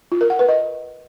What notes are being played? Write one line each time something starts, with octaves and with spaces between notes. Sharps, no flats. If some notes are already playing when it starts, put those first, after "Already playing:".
F4
A#4
F#5
B4
D#5